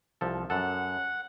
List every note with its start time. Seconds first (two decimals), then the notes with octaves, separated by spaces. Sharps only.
0.21 C2 F3 A4
0.50 F#2 A4 F#5